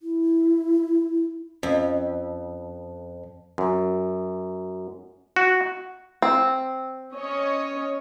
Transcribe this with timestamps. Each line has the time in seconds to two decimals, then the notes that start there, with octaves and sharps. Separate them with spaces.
0.02 E4
1.63 F2 C#4 D#5
3.58 F#2
5.36 F#4
6.22 C4
7.14 C#4 C#5 D#5